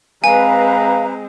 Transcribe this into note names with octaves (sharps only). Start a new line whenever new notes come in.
G#3 C4 B4 F5 G#5 A#5